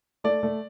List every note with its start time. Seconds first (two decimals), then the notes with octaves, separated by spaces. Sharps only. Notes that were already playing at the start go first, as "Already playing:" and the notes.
0.24 A3 D5
0.43 A3